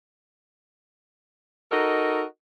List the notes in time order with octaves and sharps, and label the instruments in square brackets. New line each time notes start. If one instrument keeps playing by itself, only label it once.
[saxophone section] D#4 F#4 A4 A#4 D#5